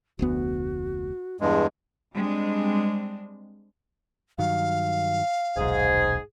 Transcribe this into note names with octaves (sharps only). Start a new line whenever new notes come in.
F1 D2 B3 F#4
E2 G2 G#3 G#4
G3 G#3 C4 D4
G2 D#3 F#3 F5
D#1 B1 G#2 G#4